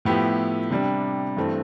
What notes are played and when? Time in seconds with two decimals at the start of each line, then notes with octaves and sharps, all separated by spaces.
0.05 A2 F3 B3 E4 G4
0.71 C3 G3 D4
1.37 G2 E3 A3 C4